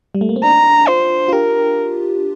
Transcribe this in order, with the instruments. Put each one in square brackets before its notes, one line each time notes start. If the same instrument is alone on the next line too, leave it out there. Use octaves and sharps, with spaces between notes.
[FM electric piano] G3
A3
A#3
C4
[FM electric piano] D4 [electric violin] A#5
[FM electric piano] F4 [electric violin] C5
[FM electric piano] F4
[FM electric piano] G4 [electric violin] A#4